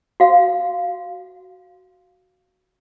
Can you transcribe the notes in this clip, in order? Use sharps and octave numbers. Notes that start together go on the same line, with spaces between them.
F#4 F5